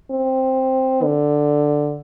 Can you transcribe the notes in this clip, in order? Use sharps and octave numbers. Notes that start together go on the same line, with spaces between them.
C4
D3